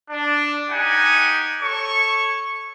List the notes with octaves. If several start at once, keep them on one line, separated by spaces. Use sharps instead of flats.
D4
D#4 G4 F#5 G#5
A4 C#5 C#6